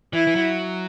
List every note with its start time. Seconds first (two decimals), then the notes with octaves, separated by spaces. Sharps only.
0.13 E3 E4
0.27 E3
0.35 F#3